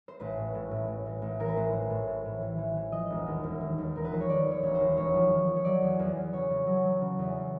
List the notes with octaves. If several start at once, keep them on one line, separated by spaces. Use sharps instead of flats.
C5
A1 B4
A2
A2
A1
A2
A1
A1
E3 A#4
B4
A2 C5
E3
A2
A2
A2
E3
E3
E3
F3 D#5
E1
D#2
E1
D#2
D#2
E1 A#4
B4
F3 C5
C#5
D#2 D5
F3
C#5
E1 C#5
C5
D#2
E1 C#5
F3
F3
F3
C#5
F#3 D5
E2
E2
E2
C#3 C#5
C#3
F#3
F#3
C#3
E2